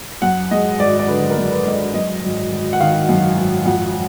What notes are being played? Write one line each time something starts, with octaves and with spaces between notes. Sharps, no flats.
F#2 F#5
G#3 D#5
G#1 D5
D5
D3 B4
A#4
F#2
B4
G#3 D#5
D5
F#2 D#5
G#1
G#1
F#5
D#3 F5
F#2
G#1
F2 F#5